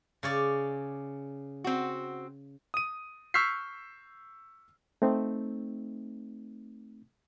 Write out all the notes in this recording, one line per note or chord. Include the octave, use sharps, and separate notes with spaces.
C#3 C#5 D5
C4 F#4
D#6 D#7
C#6 E6 F6 G6 B6 C7
A3 C4 D#4